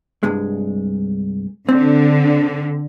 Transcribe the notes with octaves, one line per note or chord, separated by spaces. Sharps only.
C2 G2 G#3
D3 C4